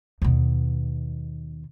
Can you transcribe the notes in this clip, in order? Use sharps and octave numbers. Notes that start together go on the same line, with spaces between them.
D#2 B2